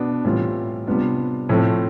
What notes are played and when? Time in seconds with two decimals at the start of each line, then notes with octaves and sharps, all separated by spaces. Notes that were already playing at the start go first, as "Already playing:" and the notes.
Already playing: B2 B3 D4
0.24 A2 E3 G3 C4 F4
0.87 C3 G3 B3 D4 F4
1.49 A2 F3 A3 C4